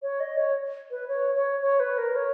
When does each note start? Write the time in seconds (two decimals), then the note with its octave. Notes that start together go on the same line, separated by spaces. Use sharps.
0.02 C#5
0.20 D#5
0.37 C#5
0.91 B4
1.08 C#5
1.35 C#5
1.61 C#5
1.80 B4
1.98 A#4
2.15 C#5